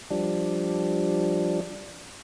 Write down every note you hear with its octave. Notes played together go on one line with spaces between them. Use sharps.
F3 G3 D4